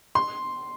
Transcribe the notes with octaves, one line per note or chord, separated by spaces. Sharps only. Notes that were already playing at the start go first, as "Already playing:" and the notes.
C6